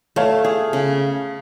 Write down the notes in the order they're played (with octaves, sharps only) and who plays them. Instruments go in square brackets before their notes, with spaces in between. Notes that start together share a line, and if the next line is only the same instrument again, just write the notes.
[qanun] A3 [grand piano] C#5 F5
[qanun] G#4
C#3